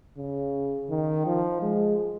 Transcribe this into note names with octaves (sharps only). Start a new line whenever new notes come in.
C#3
D#3
F3
G#3